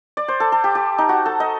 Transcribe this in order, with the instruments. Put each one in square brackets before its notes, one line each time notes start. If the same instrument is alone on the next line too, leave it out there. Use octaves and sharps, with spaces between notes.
[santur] D5
C5
A4
A4
G4
G4
D#4
F#4
A4
D#5